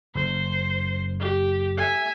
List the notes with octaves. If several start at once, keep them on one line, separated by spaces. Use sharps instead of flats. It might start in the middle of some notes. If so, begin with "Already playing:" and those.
F#1 C5
G4
E5 G#5